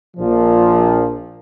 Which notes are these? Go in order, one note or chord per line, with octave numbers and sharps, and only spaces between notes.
A#1 A#2 F3